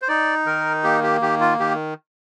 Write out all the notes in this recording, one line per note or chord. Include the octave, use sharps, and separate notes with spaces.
C5
D#4 D5
D#3 A#4
A#3 G4
G4
D#3 G4
F4
D#3 G4